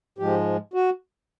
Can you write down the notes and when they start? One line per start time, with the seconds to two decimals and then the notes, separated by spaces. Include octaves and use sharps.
0.18 G#2 F3 G#3 G4
0.74 F#4